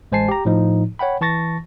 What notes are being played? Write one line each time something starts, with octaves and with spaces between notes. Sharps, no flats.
A1 G#3 C5 G#5 A5 C7
G4 A#5
A2 F3 D#4
C#5 F#5 G5 B5
E3 A5 C#6 A6 A#6